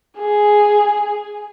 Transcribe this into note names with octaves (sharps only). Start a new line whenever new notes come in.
G#4